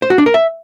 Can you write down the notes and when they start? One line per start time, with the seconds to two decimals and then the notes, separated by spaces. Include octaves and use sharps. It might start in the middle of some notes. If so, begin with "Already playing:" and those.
0.02 C5
0.10 F#4
0.18 D4
0.26 A#4
0.34 E5